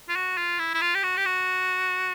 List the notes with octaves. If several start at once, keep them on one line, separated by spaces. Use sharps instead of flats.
F4
F#4
F4
E4
E4
F4
G4
F#4
G4
F#4